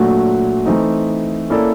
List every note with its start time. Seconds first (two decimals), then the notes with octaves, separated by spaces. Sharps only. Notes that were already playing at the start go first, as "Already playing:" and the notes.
Already playing: A#2 F#3 A3 D4 F#4
0.66 E3 A3 C4 D#4
1.50 A#3 C#4 E4 A4 D5